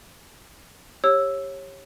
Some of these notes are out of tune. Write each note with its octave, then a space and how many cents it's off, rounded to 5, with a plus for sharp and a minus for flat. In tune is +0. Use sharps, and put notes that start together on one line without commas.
G4 +5 C#5 -20 E6 +0